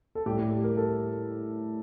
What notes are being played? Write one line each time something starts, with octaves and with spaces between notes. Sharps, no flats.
A4
A2 G3 G4
G4
G4
A#4
A4